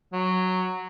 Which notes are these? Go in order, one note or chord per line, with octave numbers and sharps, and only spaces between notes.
F#3